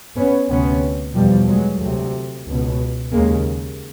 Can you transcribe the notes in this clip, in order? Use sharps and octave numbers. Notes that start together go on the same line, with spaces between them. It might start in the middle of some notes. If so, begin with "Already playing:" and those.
B3 C#4
D2 C3 B3 C#4
E2 B2 F3 G3
F#3 G#3
D2 C3
C#2 B2
D#2 C#3 G#3 A#3